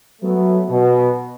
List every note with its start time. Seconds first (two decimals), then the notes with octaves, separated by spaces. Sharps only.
0.22 F#3 A3 B3
0.69 B2